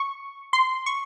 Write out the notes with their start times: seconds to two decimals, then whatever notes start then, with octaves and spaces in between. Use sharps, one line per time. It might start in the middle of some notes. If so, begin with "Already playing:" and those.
Already playing: C#6
0.53 C6
0.86 C#6